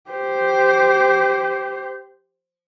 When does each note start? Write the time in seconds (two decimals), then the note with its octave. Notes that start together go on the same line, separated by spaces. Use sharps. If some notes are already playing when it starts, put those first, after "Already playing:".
0.10 G4 C5